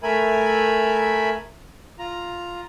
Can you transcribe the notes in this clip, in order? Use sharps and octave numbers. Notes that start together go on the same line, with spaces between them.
A3 A#4 E5 G#5 B5
F4 A#5